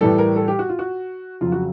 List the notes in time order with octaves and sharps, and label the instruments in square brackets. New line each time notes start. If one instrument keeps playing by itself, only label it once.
[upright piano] A2 E3 G3 A4
A#4
A4
G4
F#4
F4
F#4
F2 C#3 F#3 F4
F#4